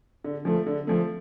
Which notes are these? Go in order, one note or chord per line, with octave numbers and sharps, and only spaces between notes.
D3
F3 A3
D3
F3 A3